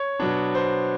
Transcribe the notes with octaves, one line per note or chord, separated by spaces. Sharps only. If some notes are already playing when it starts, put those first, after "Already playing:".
Already playing: C#5
B2 F#3 B3 D4
C5